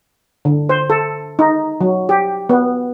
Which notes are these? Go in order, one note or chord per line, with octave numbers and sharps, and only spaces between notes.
D3
C5
A4
D#4
F#3
G4
B3